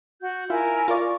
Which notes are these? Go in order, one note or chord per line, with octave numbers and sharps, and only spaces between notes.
F#4 G6
E4 F4 A#4 G#5
F4 A#4 D5 C#6